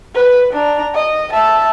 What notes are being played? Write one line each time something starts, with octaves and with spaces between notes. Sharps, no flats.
B4
D4 A#5
D#5
E5 A5